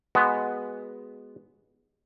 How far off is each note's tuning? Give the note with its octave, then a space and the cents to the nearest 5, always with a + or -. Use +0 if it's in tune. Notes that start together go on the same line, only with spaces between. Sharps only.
G#3 +0 B3 +0 F#4 +0